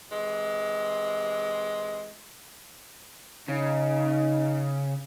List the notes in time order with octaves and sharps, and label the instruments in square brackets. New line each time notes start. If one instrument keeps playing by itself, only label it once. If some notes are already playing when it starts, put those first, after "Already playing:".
[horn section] C3 E3 G#3
[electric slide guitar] C#3 [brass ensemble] D#4